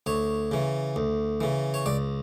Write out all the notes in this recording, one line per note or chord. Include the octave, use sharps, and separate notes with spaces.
D2 C#5
C#3 E3
D2
C#3 E3
C#5
C#2 D5